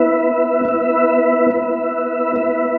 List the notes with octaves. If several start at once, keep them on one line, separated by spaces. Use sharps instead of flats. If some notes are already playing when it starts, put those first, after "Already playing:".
Already playing: B3 E4 B4 E5
B3 E4 B4 E5
B3 E4 B4 E5
B3 E4 B4 E5